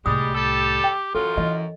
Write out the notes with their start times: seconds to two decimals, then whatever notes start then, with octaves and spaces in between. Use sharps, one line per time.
0.06 C2 A2 G3 G#3 G4 D#6
0.34 G3 A4
0.84 G5
1.15 F#2 E3 F4 A4
1.37 E3 D#5